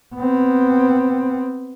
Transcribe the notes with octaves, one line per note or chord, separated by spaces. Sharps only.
B3 C4